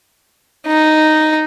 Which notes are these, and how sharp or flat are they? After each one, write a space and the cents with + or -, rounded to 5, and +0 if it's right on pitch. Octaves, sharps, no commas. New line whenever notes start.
D#4 -5